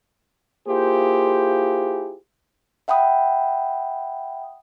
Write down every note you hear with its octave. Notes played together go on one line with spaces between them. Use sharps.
A#3 E4 F4 G4 G#4 C5
E5 F#5 G5 B5 D#6